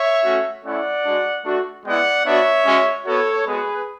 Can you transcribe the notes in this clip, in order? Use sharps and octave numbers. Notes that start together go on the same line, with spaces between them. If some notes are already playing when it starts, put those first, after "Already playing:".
Already playing: C#5 E5
A3 C#4 F#4
A3 C#4 E4 D5 F#5
G#3 D4 F#4
A3 D4 F#4
G#3 B3 E4 D5 F#5
B3 D4 F#4 C#5 E5
G#3 C#4 F#4
B3 F#4 A4 C#5
G#3 B3 F#4 G#4 B4